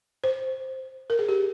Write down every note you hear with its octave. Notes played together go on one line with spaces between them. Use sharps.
C5
A#4
G#4
G4